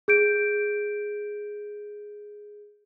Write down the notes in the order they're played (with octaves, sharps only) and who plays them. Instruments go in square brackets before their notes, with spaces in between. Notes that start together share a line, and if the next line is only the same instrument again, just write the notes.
[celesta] G#4 G6 D7